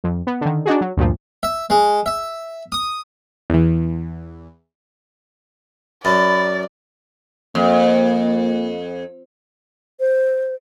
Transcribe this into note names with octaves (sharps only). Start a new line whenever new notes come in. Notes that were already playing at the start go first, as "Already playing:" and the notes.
F2
B3
D3 D#3
D4 D#4 F#4 G#4
F#3
D2 G2 A#2 F3
E5
G#3
E5
D#6
E2 E3
F#2 D5 B5 A6
F2 A#3
C5